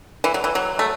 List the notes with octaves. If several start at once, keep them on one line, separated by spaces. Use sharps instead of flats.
E3
F#3
E3
F#3
A3